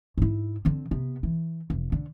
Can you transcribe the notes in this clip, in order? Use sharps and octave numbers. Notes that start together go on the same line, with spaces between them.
G#2 E4
D3 C4
C3 B3
E3
F1
D3